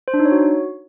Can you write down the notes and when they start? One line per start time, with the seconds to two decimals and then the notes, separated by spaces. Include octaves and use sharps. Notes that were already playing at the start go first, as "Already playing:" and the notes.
0.08 C5
0.14 D4
0.20 D#4
0.26 C#5
0.32 F#4